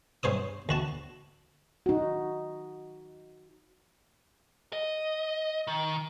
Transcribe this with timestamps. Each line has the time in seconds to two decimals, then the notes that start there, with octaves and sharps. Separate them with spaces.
0.23 G2 C5 C#5 D#6
0.69 D2 F#4 A5
1.86 D#4 F#4
4.73 D#5
5.67 D#3